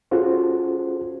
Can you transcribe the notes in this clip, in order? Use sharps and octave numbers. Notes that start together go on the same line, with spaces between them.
C#4 F4 F#4 G#4 A4 C5